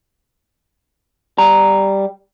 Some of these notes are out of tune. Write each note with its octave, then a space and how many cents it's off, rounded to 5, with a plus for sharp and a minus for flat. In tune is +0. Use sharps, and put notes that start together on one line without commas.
G3 +0 A#5 +0